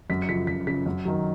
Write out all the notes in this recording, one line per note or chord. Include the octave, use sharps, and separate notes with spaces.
F#2 B6
C#7
C#3 F3 B6
F#2 B6
C#3 F3 B6
F#2
D#3 F#3